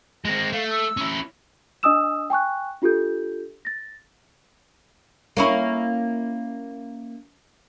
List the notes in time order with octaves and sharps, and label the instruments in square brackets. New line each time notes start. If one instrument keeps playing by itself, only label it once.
[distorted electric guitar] G#3 C4 [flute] A#6
[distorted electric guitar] A3 [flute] F5
[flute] E6
[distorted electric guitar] C#4 E4
[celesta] D4 D#5 G#5 D#6 E6 E7
G5 G#5 C#6 F#6
D4 F4 G4 A4 G6
A6 A#6
[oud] A#3 C#4 E4